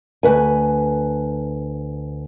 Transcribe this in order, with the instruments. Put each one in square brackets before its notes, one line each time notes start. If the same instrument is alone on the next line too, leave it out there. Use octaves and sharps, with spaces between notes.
[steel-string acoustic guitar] D2 B4 G#5